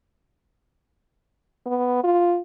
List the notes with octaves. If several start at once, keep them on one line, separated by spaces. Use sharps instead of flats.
B3
F4